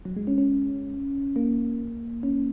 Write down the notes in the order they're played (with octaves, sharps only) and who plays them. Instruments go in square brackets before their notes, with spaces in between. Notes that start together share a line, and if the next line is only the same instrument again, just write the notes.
[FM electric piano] F#3
G#3
C#4
C#4
A#3
C#4